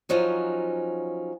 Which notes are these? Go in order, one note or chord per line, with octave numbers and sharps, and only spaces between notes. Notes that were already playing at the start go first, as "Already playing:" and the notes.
F3 F#3 C#4 D#4